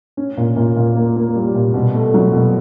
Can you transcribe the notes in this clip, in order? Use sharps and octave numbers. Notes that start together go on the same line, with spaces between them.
C#4
A#2
A#2
A#2
A#3
A#3
G3
A#2
B2
A3
F#3
B2